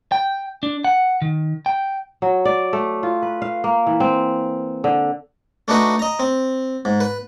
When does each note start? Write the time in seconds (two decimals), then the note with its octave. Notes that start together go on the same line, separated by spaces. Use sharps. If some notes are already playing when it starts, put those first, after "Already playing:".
0.12 G5
0.63 D4
0.85 F#5
1.22 D#3
1.66 G5
2.22 F#3
2.45 D5
2.73 A3
3.03 F4
3.22 B4
3.42 F5
3.64 A#3
3.87 E3
4.00 C4
4.84 D3
5.68 A3 D4 D#4 F#4 B4
5.99 D#5 A#5
6.19 C4
6.85 G#2
7.01 B4